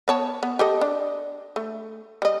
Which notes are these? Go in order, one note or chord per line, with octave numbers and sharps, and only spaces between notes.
B3 C#5 A5
B3
G4 A4 D#5
D4
A3
G3 D#5